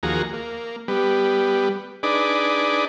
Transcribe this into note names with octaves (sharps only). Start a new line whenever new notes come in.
D#2 F3 A#3 F#4 G#4 A#5
A#3
G3 B3
D4 D#4 G#4 B4 D5